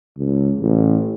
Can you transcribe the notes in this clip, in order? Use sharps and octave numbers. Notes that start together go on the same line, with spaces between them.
C#2
A1